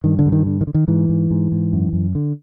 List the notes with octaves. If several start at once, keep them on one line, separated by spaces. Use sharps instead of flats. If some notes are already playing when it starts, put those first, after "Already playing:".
G2 D#3
D3
G2
D#3
D3
D#3
D3
D#3
G#2 E3
G#2
G#2
G#2
F#2
F#2
D3